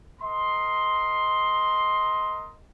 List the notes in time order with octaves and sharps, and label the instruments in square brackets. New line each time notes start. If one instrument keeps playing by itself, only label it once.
[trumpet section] A#4 D#5 C6